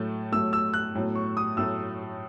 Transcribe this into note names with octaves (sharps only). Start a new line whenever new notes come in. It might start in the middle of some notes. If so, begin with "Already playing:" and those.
Already playing: A2 F#3 A3
A2 F#3 A3 E6
E6
F#6
A2 F#3 A3
C#6
D#6
A2 F#3 A3 E6